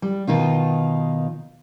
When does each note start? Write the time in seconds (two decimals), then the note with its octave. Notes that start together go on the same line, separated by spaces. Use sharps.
0.02 G3
0.27 B2 D#3 D#4 F4